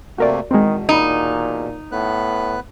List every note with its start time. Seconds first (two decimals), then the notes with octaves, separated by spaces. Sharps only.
0.18 C3 A3 A#3 F#4 A#4 D5
0.51 E2 B2 D#3 G#3 C4
0.89 A#2 D#4
1.92 A2 B3 B4 F#6